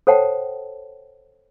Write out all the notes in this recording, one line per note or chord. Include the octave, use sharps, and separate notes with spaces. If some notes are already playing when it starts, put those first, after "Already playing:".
A4 C5 C#5 F#5 G5 A5